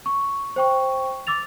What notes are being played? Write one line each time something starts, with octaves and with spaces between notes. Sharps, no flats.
C#6
C5 G5 C#6
D6 E6 A6 F7